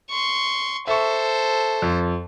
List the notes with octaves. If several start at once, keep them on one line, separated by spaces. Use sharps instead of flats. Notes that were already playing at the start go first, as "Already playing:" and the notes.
C6 C#6
A4 C5 E5 C#6
F2